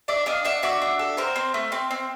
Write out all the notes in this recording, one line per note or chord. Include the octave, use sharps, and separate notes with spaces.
D4 D5 E5
D4 D#5 F5
D4 E5 F#5
F#4 D5 E5
D4
A4
C4 A#4 C5
C4
A3
C4
C4